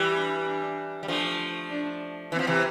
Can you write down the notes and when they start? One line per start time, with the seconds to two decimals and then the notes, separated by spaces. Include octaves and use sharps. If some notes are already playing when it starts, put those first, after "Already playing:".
Already playing: E3 G3
0.16 D4
0.46 D4
1.03 G3
1.08 F3 A3 D4
1.69 D4
2.32 E3 C4
2.39 F3
2.47 C3 E3